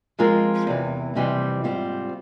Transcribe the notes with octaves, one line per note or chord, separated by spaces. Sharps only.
F3 G#3 C4 F4 A#4
E2 C3 E3
F2 C3 E3 G3 C4
G#2 G3 C4 F4